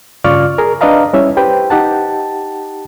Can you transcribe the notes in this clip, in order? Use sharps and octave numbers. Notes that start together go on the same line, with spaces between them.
G2 C#3 F4 D5 C#6 F6
G#4 A#4
D4 B4 D5 D#5 F5 A#5
G3 C#4 E4 C#5 E5
G4 B4 C5 G5
D#4 G4 F#5 A5